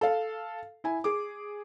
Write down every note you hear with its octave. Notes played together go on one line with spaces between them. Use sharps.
A4 F5
E4 G#5
G#4 D6